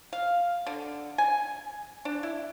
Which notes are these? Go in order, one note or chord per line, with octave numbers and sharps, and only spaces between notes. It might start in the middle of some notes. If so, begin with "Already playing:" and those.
F5
D3
G#5
D4
E4